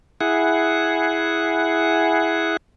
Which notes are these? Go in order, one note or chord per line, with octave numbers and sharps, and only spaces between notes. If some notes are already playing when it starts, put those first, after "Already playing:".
E4 G#4 F#5